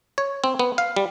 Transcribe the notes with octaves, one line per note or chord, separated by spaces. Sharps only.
C#5
C4
B3
F5
G3